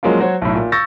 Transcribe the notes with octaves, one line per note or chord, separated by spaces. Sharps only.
F3 F#3 G#3 A#3 C#4 F4
F#3 F#4 C5 C#5
B1 A2
A#2
C#6 E6 G6 A6 A#6